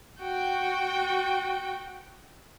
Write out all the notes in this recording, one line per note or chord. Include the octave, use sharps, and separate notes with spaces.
F#4 G5